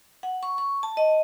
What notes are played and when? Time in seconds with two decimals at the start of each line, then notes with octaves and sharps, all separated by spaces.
0.23 F#5
0.43 C#6
0.58 C#6
0.83 A5
0.97 D#5